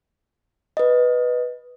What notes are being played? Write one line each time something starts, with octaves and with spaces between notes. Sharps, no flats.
B4 D#5